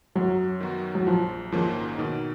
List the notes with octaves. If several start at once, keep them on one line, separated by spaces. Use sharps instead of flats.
F#2 F#3
D#3 F#3 B3 F#4
F#3
A#1 F3
G#2 D#3 F3 A#3 C#4
B2 D#3